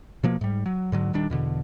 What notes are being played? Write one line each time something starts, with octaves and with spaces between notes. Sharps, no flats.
B2 F3 A#3
G#2 G3
F#3
G#2 D3 F#3
D#1 D#3 G3 D4
E2 B2 D3